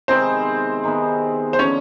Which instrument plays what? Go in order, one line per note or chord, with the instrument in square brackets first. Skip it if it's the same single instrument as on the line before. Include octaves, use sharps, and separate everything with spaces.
[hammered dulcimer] C3 D#3 G#3 B3 [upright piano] C4 C5
[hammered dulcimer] C3 D#3 G#3 B3
[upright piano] C5
[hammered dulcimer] D3 F3 [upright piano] C#4 C#5